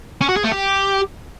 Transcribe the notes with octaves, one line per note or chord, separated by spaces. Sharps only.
C#4
F#4
G#4
A3
G4